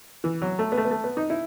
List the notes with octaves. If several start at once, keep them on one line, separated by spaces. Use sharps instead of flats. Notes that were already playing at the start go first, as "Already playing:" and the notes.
E3
F#3
A3
B3
A3
B3
A3
B3
D#4
E4